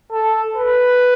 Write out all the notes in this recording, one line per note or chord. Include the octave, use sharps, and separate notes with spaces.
A4
B4